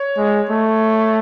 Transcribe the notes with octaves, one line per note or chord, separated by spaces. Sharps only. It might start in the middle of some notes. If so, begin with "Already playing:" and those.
Already playing: C#5
G#3
A3